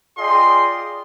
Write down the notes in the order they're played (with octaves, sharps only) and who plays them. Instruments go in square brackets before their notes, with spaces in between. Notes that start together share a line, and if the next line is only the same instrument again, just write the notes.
[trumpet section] F4 G#4 D5 D#5 G5 C6